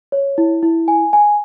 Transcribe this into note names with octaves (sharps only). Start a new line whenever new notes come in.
C#5
E4
E4
G#5
G#5